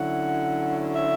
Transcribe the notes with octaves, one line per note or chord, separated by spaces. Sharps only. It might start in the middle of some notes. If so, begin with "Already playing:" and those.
Already playing: D3 F#3 C#4 E4 F#5
E5